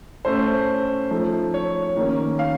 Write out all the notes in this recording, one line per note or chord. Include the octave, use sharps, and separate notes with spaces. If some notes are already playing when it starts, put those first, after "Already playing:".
A2 A3 C#4 C5
F3 A3 D#4
C#5
D#3 A#3 C#4
F5